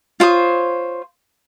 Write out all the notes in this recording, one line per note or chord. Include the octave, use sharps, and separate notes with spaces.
F4 C5 C#5 D#6